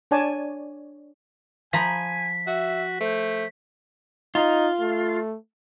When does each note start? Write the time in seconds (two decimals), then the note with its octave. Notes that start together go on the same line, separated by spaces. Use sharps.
0.11 D4 C#5 D5 G#5 A5
1.73 F3 G#5 A#5 B5 B6
2.47 F#4 E5
3.01 A3 C5
4.35 D#4 F4
4.80 A3